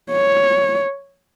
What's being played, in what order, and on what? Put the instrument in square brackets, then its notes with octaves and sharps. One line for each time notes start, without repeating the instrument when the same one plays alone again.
[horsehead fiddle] C#5